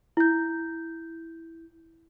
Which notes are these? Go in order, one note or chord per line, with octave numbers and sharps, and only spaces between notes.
E4 G6